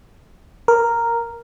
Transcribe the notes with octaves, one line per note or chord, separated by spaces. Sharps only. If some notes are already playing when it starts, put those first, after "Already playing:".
A#4